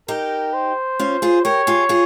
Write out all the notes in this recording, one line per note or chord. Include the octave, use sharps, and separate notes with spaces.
D#4 G4 A#4
C5
C#4 F4
F4 G#4
G4 A#4 C#5
F4 G#4
F4 G#4